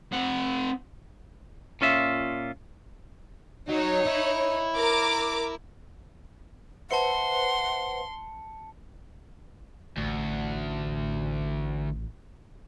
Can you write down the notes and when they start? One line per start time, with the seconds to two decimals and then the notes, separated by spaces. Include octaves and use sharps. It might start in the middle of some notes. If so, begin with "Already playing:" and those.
0.13 C4 F#5
1.81 A#2 C#4 F4 E5
3.69 F#3 D#4 C#5
4.06 E4
4.75 A#4 D6
6.91 B4 C5 E5 F#5 A5 C6 C#7
9.97 A1 D2